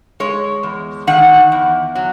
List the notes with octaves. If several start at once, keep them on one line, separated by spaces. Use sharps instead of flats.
G#3 C#5
E2
D#3 F#5
E2
F#3